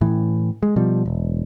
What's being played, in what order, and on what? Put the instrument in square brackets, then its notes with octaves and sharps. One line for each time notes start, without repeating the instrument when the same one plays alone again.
[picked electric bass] A2 E3
G#3
B2 F3 G3
E1